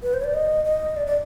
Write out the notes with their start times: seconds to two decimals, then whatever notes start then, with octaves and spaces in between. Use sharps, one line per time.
0.03 B4
0.14 C5
0.20 C#5
0.24 D5
0.34 D#5
0.65 D#5
0.97 D5
1.07 D5